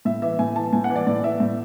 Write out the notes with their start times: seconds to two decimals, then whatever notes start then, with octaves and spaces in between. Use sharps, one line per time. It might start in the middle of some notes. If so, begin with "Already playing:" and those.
0.05 A2 E5
0.22 E3 E5
0.39 A2 G#5
0.56 E3 A5
0.73 A2 G#5
0.84 F#5
0.90 E3
0.96 D5
1.07 A2 D5
1.24 E3 E5
1.40 A2